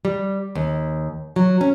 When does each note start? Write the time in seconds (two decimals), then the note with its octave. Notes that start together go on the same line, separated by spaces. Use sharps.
0.05 G3
0.55 D#2
1.36 F#3
1.61 C#4